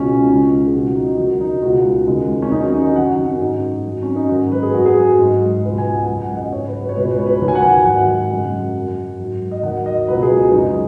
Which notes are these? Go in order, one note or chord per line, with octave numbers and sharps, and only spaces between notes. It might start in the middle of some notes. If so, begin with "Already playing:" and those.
Already playing: C#2 B2 G#3 C#4
C#2 C#3 G#3 D#4
G#4
C#2 B2 F#3 F#4
F#4
D#4
D#4
D#2 D#3 F#3 F#4
D#4
C#2 B2 G#3 F#4
D#2 C#3 G#3
C#4
D#2 C#3 F#3 D#4
C#4
D#4
F#4
F#2 D#3 F#3 F#5
F#4
C#4
G#2 G#3 D#4
F#2 F#3
C#4
D#4
G#2 D#3 F#3 F#4
B4
G#4
F#2 F#3 F#4
G#4
G#2 G#3
C#2 B2 F#3 B4
G#5
F#5
F#2 C#3 G#3 G#5
F#5
F#5
D#5
G#2 G#3 C#5
B4
B4
C#5
C#2 B2 G#3 B4
C#5
B4
C#5
B4
D#2 D#3 F#3
G#5
F#5
G#5
G#2 D#3 F#3 F#5
F#2 C#3 G#3
F#2 F#3
G#2 F#3
D#5
D#2 D#3 F#3 F#5
D#5
C#2 B2 F#3 B4
G#4
F#2 C#3 G#3 D#4